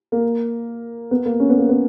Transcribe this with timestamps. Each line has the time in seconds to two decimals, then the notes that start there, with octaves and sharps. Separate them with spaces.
0.12 A#3
1.11 B3
1.26 A#3
1.40 C#4
1.49 B3
1.58 A#3
1.69 B3